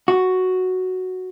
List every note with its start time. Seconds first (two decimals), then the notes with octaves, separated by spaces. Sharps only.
0.08 F#4